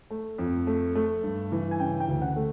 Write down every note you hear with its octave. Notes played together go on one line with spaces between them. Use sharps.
A3
F2
A3
A3
G2
E3
G#5
C#3 G5
G5
D2
F#5
A3